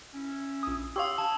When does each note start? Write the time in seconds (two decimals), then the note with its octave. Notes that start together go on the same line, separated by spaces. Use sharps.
0.14 C#4 E4
0.63 A#1 D#6
0.96 G4 C#5 F5 C6 D#6 E6
1.18 D4 G#5 A5